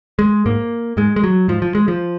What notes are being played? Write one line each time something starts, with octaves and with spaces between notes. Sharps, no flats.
G#3
G#2 A#3
G#2 G#3
G#3
F#3
G#2 F3
F3
G#3
F3